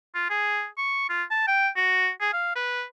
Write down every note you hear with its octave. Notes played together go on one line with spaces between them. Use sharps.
F4
G#4
C#6
F4
A5
G5
F#4
G#4
F5
B4